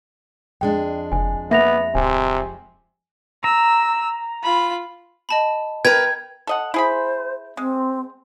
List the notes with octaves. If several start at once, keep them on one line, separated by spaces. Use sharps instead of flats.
F2 G#3 D4 G5
F#1 G#5
A#3 B3 E5 A#6 F7
D1 C3 G#5
A#5 E6
F4 B5
D#5 A5 B5
A#4 B4 G5 A#5 G6 G#6
A4 D#5 F#5
E4 G#4 C5 B5
G#3 C4